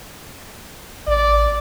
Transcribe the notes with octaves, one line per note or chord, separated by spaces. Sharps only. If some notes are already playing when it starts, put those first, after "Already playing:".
A1 D5